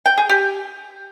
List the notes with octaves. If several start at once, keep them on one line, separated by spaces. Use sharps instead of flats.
G5
G#4
G4